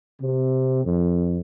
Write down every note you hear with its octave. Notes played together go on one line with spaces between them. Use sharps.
C3
F2